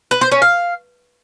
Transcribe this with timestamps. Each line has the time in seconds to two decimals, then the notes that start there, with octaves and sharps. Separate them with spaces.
0.11 B4
0.21 C5
0.32 C#4
0.42 F5